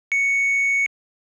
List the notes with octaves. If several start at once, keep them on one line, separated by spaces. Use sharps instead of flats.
C#7